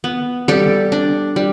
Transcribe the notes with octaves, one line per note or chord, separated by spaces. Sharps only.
B3
G3 G4 A4
D4
G3